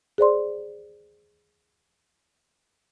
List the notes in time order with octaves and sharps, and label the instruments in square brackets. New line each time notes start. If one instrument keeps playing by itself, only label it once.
[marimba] G#4 C5 D5 C6